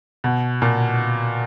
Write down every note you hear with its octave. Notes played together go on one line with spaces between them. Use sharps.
B2
A#2